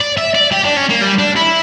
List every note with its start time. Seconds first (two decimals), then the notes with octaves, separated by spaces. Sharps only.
0.01 D5
0.18 E5
0.35 D5
0.51 G4
0.64 D4
0.77 C#4
0.90 A#3
1.02 G3
1.19 D4
1.36 E4